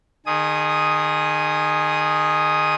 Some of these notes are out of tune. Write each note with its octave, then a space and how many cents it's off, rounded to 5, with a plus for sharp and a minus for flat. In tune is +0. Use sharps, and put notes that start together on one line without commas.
D#3 -30 G#4 +0 D#6 +0